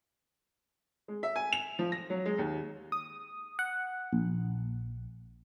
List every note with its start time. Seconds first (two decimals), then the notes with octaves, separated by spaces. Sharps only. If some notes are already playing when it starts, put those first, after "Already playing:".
1.08 G#3
1.23 E5
1.36 G#5
1.53 F7
1.79 F3
1.92 A#6
2.10 F#3
2.26 G#3
2.38 D#2
2.92 D#6
3.59 F#5
4.13 A#1